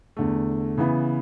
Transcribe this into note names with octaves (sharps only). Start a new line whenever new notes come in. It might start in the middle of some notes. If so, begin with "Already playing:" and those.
E2 D3 A3
C#3 E3 B3